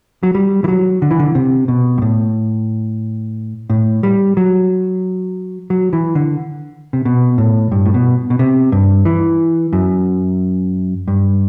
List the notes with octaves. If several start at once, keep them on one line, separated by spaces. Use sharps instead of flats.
F#3
G3
E3
F#3
D3
E3
D3
C3
B2
G2
A2
A2
G3
F#3
F#3
E3
D3
C3
B2
A2
G2
A2
B2
B2
C3
G2
E3
F#2
G2